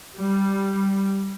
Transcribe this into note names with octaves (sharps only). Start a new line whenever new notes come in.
G3